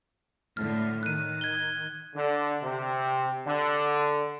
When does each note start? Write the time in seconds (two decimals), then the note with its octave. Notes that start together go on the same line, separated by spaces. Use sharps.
0.57 A2 D3 F6
1.03 D#3 F#6 D#7
1.41 G#6 G7
2.14 D3
2.62 C3
3.46 D3